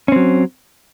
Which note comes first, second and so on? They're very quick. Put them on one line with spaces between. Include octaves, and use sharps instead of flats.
C#4 C4 F#3